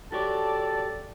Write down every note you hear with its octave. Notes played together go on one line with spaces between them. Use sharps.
F#4 G4 A4 C#5 D5 A5